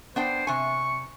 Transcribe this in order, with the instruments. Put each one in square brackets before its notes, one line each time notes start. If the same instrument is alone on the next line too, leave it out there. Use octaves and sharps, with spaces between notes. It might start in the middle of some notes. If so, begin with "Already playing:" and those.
[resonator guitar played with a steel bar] B3 D4 G5 [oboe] C5
[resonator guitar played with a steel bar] C3 G#5 [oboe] C#6